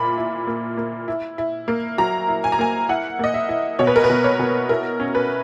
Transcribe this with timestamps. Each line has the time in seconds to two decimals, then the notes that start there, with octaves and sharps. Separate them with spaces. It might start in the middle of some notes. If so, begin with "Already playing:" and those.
Already playing: A#2 A#3 E4 B5
0.18 E4
0.47 A#3
0.77 A#3
1.08 E4
1.38 E4
1.68 A#3
1.98 F#3 A#5
2.28 E4
2.44 G#5
2.52 A#5
2.59 A#3 G#5
2.89 E4 F#5
3.19 A#3 D#5
3.34 E5
3.49 E4
3.79 B2 C#5
3.87 B4
3.96 A#4
4.04 B4
4.09 B2
4.24 C#5
4.39 B2
4.69 E4 A#4
5.00 C#4
5.15 B4